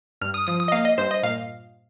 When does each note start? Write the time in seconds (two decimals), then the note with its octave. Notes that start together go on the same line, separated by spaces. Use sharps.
0.21 G2 F6
0.34 D#6
0.47 F3 D#6
0.60 D#6
0.68 D#5
0.72 A#3 F5
0.85 D#5
0.98 G2 C5
1.11 D#5
1.23 A#2 F5